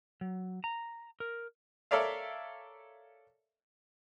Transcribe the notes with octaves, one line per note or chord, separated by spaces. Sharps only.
F#3
A#5
A#4
A4 A#4 C#5 D5 E5 F5